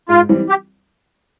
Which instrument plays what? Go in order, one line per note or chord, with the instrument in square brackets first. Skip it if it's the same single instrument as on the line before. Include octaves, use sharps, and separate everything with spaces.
[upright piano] G#2 [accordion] F4
[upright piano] E3 G3 C4
[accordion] G4